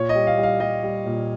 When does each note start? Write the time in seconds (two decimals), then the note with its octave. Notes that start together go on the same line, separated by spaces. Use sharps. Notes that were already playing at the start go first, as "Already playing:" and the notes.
Already playing: A#2 C#5
0.09 D#5
0.15 G3
0.27 F5
0.37 G3
0.43 F5
0.60 G3 D#5
0.83 G3
1.06 A#2